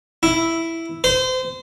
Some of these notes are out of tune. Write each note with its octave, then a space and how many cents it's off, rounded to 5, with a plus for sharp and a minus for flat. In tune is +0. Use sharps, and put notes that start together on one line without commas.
E4 +0
C5 -30